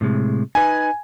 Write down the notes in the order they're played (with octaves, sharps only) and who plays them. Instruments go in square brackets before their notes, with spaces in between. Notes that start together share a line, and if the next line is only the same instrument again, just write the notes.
[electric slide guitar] A2 C3 G#3
[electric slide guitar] D#4 B4 [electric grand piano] G#5